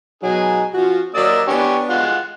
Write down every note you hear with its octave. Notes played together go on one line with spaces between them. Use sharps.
B2 F#3 D#4 G#4
F3 C#4 F4 F#4
F#3 A#3 D5 D#5 E6
B3 D4 G4 C#5 G#5
G#3 F4 F#5